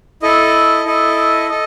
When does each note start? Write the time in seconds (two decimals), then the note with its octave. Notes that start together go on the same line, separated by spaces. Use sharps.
0.22 E4 A4 D#5
0.85 E4 A4 D#5
1.49 A4 D#5